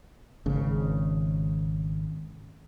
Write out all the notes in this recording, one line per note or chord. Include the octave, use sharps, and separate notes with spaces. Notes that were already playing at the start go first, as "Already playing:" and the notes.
G#1 C#3